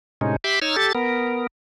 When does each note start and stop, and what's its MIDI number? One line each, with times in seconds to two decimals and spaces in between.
0.21 0.36 45
0.21 0.36 48
0.21 0.36 56
0.21 0.36 61
0.21 0.36 63
0.44 0.59 67
0.44 0.59 76
0.44 0.59 83
0.44 0.59 84
0.44 0.59 86
0.62 0.76 63
0.62 0.76 73
0.62 0.76 88
0.62 0.76 89
0.76 0.93 67
0.76 0.93 69
0.76 0.93 93
0.95 1.47 59
0.95 1.47 70